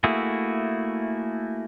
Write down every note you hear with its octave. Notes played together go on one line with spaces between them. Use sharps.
A3 A#3 E4 F#4 G#4